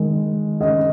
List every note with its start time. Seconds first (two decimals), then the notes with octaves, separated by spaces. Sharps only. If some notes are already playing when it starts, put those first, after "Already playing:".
Already playing: D#3 G#3
0.61 D#5